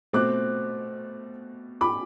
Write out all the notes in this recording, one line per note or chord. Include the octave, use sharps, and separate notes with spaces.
B2 A3 C4 D6 F#6
B5 D6